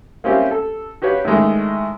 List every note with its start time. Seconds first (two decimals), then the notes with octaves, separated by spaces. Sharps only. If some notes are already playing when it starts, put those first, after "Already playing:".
0.24 A#3 C4 C#4 E4 F4 G4
0.51 A4
1.02 F#4 G4 B4 C#5 F5
1.25 A2 D#3 G#3 A3